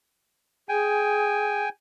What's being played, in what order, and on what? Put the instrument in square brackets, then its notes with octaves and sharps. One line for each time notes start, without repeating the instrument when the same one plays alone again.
[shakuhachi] G#4 [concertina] G5 G#5